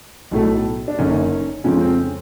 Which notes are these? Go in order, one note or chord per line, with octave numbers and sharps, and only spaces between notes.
B1 A2 F#3 A3
D4
F#1 F#2 D3 C#4 D#4
F2 C#3 F3 G#3 C#4
C4
C#4